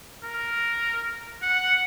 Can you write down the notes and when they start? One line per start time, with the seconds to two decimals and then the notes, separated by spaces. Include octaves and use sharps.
0.24 A#4
1.43 F#5